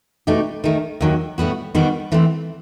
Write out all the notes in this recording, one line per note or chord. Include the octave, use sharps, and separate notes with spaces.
B2 A3 D#4 G4
D#3 A3 D#4
D#2 D#3 F#3
A2 G3 B3 F#4
D#3 G3 B3 F#4
E3 A3 C4